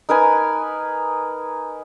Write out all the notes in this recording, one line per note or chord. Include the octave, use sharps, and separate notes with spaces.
D#4 A#4 B4 G#5